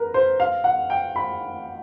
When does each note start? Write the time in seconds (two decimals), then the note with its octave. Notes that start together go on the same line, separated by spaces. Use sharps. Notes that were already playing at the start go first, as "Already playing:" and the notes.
Already playing: A#4 B4
0.14 C5
0.40 F5
0.64 F#5
0.90 G5
1.16 B5